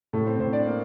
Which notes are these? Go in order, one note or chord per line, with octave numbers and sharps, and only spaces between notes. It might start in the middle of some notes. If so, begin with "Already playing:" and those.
A2 A3 A4
C4 C5
A2 C4 C5
D4 D5
A#3